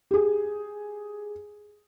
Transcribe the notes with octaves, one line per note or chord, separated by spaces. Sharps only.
G4 G#4